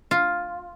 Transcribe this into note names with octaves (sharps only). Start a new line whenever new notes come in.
F4